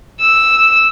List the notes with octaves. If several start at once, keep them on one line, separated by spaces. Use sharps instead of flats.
E6